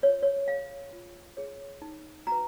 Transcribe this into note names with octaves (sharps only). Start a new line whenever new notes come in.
F4 C#5
C#5
G#4 C#5 F5
F4
G#4 C#5
D#4
F#4 B4 A#5